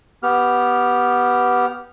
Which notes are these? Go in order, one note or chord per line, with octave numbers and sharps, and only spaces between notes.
B3 G4 F6